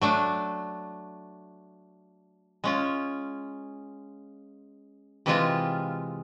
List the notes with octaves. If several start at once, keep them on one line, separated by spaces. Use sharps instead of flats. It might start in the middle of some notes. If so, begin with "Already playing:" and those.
F#3 A3 D4
G#3 C#4 F4
C3 E3 G#3 C4 F4